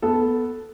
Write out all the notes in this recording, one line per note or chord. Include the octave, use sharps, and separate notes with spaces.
B3 A4